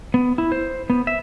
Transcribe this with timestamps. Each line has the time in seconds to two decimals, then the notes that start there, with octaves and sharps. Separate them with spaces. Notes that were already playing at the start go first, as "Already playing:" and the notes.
0.14 B3
0.38 E4
0.52 C5
0.90 B3
1.07 E5